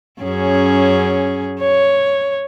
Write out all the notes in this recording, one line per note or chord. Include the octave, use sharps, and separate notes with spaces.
F#2 C#4 G#4
C#5